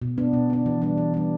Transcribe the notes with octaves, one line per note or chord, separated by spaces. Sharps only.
B2
B3 D4
B2
B3 D4
E3
G3 D4
E3
G3 D4